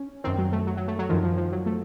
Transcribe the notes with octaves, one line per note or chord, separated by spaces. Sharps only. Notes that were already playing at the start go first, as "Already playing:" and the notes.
Already playing: C#4
F#2 D#3 C4
F#3
A3
F#3
F#3
A3
F#3
F#2 D#3 F3
F3
F3
F#3
A3